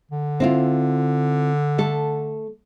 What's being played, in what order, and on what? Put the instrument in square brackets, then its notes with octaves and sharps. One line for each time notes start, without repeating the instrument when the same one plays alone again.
[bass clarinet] D3
[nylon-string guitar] C4 E4 F4
A3 A4